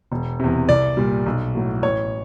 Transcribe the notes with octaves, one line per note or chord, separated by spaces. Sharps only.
E1
E2 C3
C2 D5
A#2 G3
B1
A2 F#3
A1 C#5